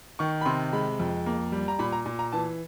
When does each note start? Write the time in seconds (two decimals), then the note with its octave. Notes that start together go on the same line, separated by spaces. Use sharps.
0.19 D#3 C#6
0.41 B5
0.46 C3 C6
0.73 G#3 B5
0.99 F2
1.26 A#3
1.52 G3
1.68 A#5
1.79 A#2 B5
1.93 A#5
2.06 A#2
2.19 A#5
2.32 E3 A5